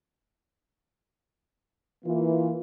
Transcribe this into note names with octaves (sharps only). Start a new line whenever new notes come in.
E3 A#3 F4